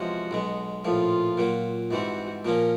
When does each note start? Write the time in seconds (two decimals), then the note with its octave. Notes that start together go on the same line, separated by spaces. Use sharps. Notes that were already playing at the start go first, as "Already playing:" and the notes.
Already playing: E2 C3 F3 G#3 C#4 F#4
0.31 B1 B2 G#3
0.84 A#1 A2 F3 F4
1.37 A#2 F#3 A#3
1.91 G#2 E3 G3 C4 F#4
2.44 A#2 F3 A#3 C#4 A#4